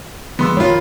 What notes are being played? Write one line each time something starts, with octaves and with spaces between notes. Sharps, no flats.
D3 F3 G#3 B3 C6 E6
D#3 F4 C#5 B5